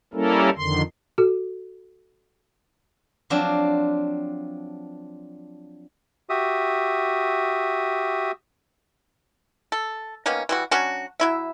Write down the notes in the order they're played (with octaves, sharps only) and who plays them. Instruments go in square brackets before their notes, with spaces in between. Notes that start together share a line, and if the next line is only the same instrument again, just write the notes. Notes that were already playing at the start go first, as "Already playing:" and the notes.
[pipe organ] G3 A#3 C#4 E4 A4 A#4
F2 D3 D#3 C6
[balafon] F#4 A4
[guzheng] F3 F#3 C4 D4
[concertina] F#4 G4 E5 D#6
[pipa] A4
D#3 A#3 B3 C#4
E3 G3 F#4
F#3 C#4 D4 F#4
F#3 E4 E5